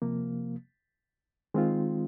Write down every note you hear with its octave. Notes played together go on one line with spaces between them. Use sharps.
C3 F3 A#3
D#3 G#3 C4 F4